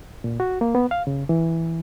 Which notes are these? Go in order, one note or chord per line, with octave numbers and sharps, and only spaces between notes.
A#2
F#4
A#3
B3
F5
C#3
E3